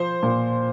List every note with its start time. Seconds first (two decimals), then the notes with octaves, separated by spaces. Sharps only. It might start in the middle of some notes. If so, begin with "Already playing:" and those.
Already playing: F3 C5
0.23 A#2